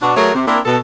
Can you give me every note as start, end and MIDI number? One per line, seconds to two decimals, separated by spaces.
0.02 0.15 47
0.02 0.15 62
0.02 0.15 66
0.16 0.33 54
0.16 0.33 57
0.16 0.33 66
0.16 0.33 68
0.16 0.33 70
0.16 0.33 73
0.35 0.44 48
0.47 0.59 58
0.47 0.59 60
0.47 0.59 62
0.47 0.59 64
0.47 0.59 70
0.65 0.77 47
0.65 0.77 69